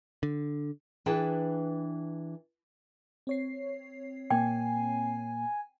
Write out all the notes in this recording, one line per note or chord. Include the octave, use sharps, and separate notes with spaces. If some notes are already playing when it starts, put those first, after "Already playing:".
D3
E3 D4 G#4 B4 G5 A5
C4 C#5 C7
A#2 A#3 G5 G#5